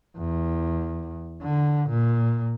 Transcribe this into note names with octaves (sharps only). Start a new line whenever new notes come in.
E2
D3
A#2